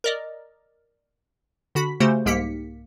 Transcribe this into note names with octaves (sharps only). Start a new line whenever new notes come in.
A#4 D5 D#5
D3 F#4 B5 B6
C#3 A3 F#4 G4 C5
C2 G#2 A#3 G4 B6 C#7